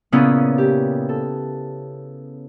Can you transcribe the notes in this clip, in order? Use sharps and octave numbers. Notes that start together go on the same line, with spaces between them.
A#2 C#3 A#3 B3 C#4 E4
G4
A4